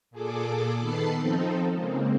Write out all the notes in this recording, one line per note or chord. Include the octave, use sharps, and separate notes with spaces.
A#2 G#4 A4 D6
D#3 B3 A4 A5 B5 C7
F3 C4 D#4 A4
C#3 G#3 A#3 C4